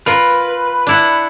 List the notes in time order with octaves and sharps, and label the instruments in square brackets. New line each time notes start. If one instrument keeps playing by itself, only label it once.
[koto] F4 A#4 [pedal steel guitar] B4
[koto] D4 E4 F#5